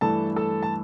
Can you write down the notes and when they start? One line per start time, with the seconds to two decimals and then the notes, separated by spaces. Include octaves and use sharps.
0.01 G2 E3 A3 A4 A5
0.36 A4 A5
0.63 A5